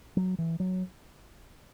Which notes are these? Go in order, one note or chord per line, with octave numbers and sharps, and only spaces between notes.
F#3
E3
F#3